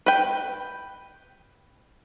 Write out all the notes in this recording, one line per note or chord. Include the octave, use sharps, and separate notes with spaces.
B4 G5